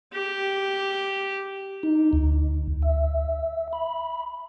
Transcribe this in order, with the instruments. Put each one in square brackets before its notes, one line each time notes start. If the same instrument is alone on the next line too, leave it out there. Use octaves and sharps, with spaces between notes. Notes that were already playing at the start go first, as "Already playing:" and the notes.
[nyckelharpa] G4
[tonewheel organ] D#4
D2
E5
B5